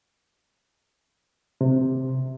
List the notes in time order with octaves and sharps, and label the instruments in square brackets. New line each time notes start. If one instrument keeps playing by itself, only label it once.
[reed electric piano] C3